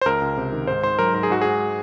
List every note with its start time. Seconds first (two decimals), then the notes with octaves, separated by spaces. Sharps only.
0.01 C5
0.06 C#2 A#4
0.22 C#2
0.37 C3
0.52 D#3
0.67 G#2 C5
0.83 G#2 C5
0.99 F#3 A#4
1.14 G#2 A#4
1.23 G#4
1.30 G#2 F#4
1.41 G#2 G#4